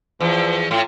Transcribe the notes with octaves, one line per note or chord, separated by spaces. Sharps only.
E2 F3
A2 F4